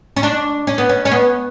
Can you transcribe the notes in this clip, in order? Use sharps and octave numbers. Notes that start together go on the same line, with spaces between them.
C#4
D4
C#4
B3
C#4
C#4
B3